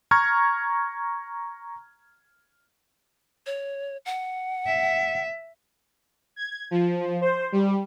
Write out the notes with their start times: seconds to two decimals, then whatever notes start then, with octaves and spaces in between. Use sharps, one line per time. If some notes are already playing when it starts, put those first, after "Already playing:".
0.11 A#5 C#6 F6 G#6
3.46 C#5
4.05 F#5
4.66 E5
6.36 G#6
6.71 F3
7.21 C5
7.52 G3